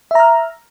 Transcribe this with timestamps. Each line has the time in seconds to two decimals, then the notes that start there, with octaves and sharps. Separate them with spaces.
0.11 E5
0.15 A#5
0.20 F6